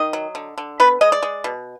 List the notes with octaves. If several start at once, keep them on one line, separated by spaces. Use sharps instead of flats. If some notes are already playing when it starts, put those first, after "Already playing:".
Already playing: D#3 D#5
F#3
D3
D3
B3 B4
G#3 D#5
D5
G#3
B2